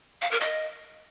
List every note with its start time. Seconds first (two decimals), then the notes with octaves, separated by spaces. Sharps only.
0.22 F5
0.31 A#4
0.41 D#5